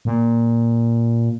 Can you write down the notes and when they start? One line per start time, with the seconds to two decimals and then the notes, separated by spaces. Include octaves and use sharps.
0.05 A#2